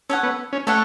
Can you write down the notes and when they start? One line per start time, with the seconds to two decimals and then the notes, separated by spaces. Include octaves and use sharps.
0.09 C#4 A4 C#5 F#5
0.23 B3
0.53 C#4
0.67 A3 A4 C#5 F#5